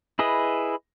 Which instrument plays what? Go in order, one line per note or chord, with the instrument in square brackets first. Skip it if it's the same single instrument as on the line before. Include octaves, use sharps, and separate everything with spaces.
[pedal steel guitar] E4 G#4 B4 D#5